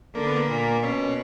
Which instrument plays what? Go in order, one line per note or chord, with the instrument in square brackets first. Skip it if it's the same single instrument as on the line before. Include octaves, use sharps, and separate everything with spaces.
[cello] D3 [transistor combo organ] A#3
[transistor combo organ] B3
A#3
[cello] A#2
[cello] B2 [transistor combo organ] C#4